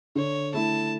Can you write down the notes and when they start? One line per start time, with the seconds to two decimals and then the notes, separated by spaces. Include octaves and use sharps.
0.15 D3 C#5
0.54 A3 E4 A5